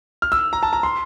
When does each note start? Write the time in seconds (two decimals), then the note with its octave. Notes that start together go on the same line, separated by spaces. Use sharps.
0.22 F6
0.32 E6
0.53 A#5
0.63 A5
0.73 A#5
0.83 C6